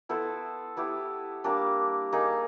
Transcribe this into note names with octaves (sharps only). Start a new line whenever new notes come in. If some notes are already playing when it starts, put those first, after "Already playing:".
B3 E4 A4 C5
B3 E4 G4
G3 A#3 D4
A#3 D#4 G#4